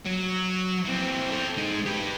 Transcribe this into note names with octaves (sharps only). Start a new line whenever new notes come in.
F#3
E3 C4
A4 G5
G#3 D#4
G4 B4